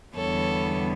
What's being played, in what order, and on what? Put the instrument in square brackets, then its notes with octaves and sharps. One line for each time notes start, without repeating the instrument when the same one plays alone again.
[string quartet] E2 D3 G3 B3 A4 C#5